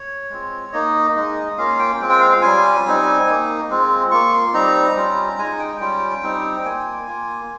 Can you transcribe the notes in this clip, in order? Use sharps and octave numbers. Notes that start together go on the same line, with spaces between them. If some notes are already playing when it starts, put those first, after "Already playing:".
Already playing: C#5
G#3 C4 F4
A#3 D#4 D#5
G#3 D#4
A#3 C#4 F4 F5
G5
G#3 C4 F4
G5
F5
F5
G3 C#4 F4 G#5
G3 C4 D#4
A#3 D#4
G#3 C4 F4
A#3 F4 C#6
C6
G3 C4 D#4 A#5
G3 C#4 F4
G#3 D#4 G#5
G5
G3 C#4 F4 G5
G3 C4 D#4
A#3 F4 G#5
A#3 F4